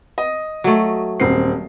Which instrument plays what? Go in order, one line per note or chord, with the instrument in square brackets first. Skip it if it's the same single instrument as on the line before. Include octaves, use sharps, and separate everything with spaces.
[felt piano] D#5
[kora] F#3 A3
[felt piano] D#1 C4 C7